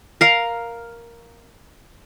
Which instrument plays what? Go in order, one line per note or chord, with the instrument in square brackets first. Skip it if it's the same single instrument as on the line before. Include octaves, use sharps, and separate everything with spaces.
[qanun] A#4 F5 A#5